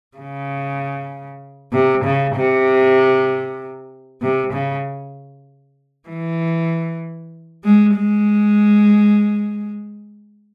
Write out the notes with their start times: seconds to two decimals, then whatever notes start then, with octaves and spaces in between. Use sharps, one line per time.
0.17 C#3
1.73 C3
2.04 C#3
2.35 C3
4.22 C3
4.53 C#3
6.09 E3
7.64 G#3
7.96 G#3